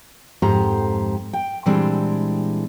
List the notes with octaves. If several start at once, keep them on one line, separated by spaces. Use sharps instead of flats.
F2 G#2 G4 C5 A#5
G5
A#2 E3 G3 G#3 C4 D4